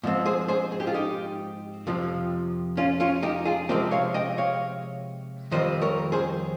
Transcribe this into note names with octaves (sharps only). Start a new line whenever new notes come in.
G#2 F3 C4
G#4 C5
G#4 C5
G#4
G4
F4 G#4
D#4 G4
F2 C3 F3
C#4 F4
C#4 F4
D#4 G4
F4 G#4
C3 F3 G#3 C4 G4 A#4
C#5 F5
D#5 G5
C#5 F5
F2 D#3 G3 C4 C5 D#5
A#4 C#5
G#4 C5